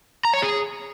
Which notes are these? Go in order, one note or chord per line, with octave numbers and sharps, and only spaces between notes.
A#5
C#5
G#4